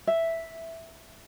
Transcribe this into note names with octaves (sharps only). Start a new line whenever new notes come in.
E5